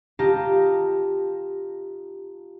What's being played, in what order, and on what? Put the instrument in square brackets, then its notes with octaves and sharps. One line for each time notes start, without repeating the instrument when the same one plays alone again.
[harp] D#4 F4 G4 A5 A#5